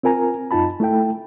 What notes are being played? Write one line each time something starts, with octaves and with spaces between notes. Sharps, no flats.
C4 F4 A#4 G#5 A#5
F#2 D#4 F4 A5 B5
A3 E4 A4 G5